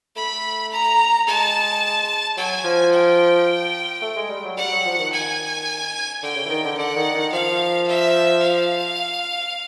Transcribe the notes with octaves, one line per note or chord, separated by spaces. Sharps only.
A3 B5
A#5
G#3 A5
F#3 G#5
F3
G5
A3
G#3
G3
F#3
G3 F#5
F#3
F3
D#3
G#5
D3 G5
C#3
E3
D#3
D3
D3 F#5
D#3
D#3
F3 F5
E5
F5